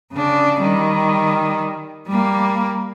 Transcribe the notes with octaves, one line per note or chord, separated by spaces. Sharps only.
C#3 D4
D#3 G3
G3 A#3